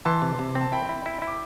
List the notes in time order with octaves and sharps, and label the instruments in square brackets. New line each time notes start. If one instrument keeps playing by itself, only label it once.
[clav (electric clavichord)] E3 [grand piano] A5 C6
[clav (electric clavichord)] C3
C3
C4
[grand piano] A5
[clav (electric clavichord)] E4 [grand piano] G5 B5
[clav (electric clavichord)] E4
E4
E4
[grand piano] D6